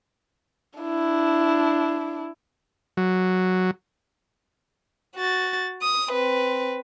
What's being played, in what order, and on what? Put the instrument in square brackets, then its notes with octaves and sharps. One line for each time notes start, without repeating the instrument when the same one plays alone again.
[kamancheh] D4 E4
[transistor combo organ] F#3
[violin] F#4 A6
D#6
C4 B4